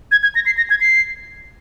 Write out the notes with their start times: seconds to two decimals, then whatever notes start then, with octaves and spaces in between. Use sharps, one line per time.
0.12 G#6
0.23 G#6
0.35 A#6
0.46 C7
0.57 A#6
0.70 G#6
0.81 C7